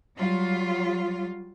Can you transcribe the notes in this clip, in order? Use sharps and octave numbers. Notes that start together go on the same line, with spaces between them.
F#3 G3 F4